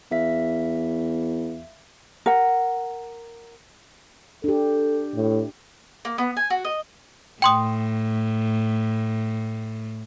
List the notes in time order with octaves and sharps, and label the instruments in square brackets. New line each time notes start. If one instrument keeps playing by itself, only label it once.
[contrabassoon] E2 [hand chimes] E5 F5 B6
[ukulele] A#4 F#5
[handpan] D4 G4 [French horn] A4
[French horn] A2
[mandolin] A#3
B3
G#5
F#4
D#5
[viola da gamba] A2 [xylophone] G5 C6 D#6